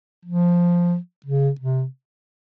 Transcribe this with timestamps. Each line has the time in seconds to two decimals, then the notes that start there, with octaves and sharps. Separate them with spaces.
0.25 F3
1.26 C#3
1.61 C3